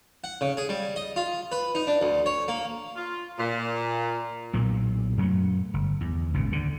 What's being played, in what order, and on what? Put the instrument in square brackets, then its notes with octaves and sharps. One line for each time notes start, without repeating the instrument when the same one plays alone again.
[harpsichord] F#5
C#3
G#4
G3
D#5
F4
B4
D#4
D4
D2
C#5
A#3
[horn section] F4
A#2
[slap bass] B1 A#2 A#3
F#2 F#3 G3 A3
G1
E2
G#1 C#2 A#2
D2 D3